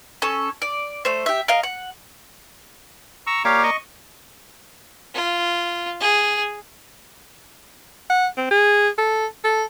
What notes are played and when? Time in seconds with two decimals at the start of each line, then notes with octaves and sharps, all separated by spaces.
0.22 C#4 A4
0.62 D5
1.05 A3 C5
1.26 G4 E5
1.48 A#4 D#5 F5
1.63 F#5
3.27 A#5 C#6 E6
3.45 A#3 G4 C#5 D5 F5
3.63 D#5 C#6
5.14 F4
6.00 G#4
8.10 F#5
8.37 C4
8.51 G#4
8.98 A4
9.44 A4